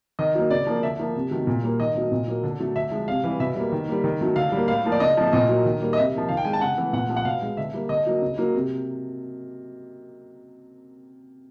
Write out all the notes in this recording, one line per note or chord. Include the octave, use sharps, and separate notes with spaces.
D#3 D#5
F#3 A#3
C#3 D5
F3 A#3
D3 E5
F3 A#3
C3
D#3 F#3 A3
A#2
G3 A#3
D#3 D#5
F#3 A3
A#2
F#3 A#3
D3
F#3 A3
D3 E5
F3 G#3
C3 F5
E3 G3
B2 E5
G3 A#3
D#3
G3 A#3
D#3
F#3 A3
D3 F5
G3 A#3
A2 F5
F3 A#3
D5
C#3 D#5
F3 A3
A#2 D#5
F#3 A#3
D#3
G3 A#3
D#5
C3 E5
F3 A#3
D#3 F5
G5
G#3 G#5
A5
C#3 F#5
E3 A3
A#2 F#5
F3 A3
F#5
B2 F5
G#3
D3 E5
G3 A#3
D3 D#5
F#3 A#3
C#3
F#3 A#3
C3